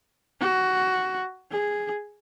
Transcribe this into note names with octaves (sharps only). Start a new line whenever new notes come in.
F#4
G#4